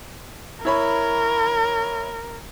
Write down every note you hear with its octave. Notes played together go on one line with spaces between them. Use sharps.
E4 A#4 C#5 B5